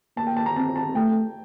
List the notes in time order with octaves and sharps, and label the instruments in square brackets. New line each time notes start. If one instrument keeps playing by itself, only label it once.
[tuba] A#3 [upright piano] A5
[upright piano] G5
A5
A#5
[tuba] C4 [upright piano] A5
[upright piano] A5
[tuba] A3 [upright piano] G5